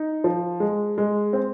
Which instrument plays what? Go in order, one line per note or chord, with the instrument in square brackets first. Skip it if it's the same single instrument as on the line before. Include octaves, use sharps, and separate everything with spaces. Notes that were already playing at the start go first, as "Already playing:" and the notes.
Already playing: [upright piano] D#4
F3
G#3
G#3
C4